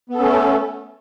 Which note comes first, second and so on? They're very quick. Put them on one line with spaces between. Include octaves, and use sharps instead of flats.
B3 A4 C#4 A3